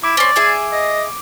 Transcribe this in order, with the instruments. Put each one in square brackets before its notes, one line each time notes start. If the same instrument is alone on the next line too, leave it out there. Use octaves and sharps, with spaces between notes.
[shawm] E4 [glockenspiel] D6 D7
[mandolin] C4 C#4 [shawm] D5
[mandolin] G#4 E5 G#5
[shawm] D#5